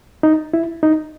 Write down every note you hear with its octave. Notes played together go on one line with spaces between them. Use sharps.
D#4
E4
D#4